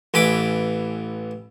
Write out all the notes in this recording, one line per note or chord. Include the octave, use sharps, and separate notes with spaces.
A1 E3 G#5 B5 D6